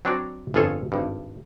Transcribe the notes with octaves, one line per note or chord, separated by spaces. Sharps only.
F#3 C4 D4 F#4 C#5 D5
G1 F2 F4 G#4 A4 C#5
G#1 G2